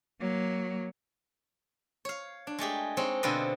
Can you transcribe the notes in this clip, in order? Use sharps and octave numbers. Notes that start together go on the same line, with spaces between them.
F#3 A#3
C#5 F5
D4
G#3 A3 G4 G#4
G#3 C4 D#4 C#5
B2 D3 C4 F4 B4 D#5